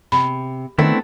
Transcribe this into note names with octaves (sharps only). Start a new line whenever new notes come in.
C3 B5
D#3 A3 B3 C4 D4 E4 A4